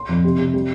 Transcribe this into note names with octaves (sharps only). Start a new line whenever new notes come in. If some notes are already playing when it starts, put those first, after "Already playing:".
Already playing: C6
F2
C3
C3
G3